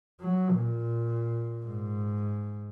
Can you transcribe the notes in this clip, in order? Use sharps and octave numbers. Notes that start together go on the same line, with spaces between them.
F#3
A#2
G#2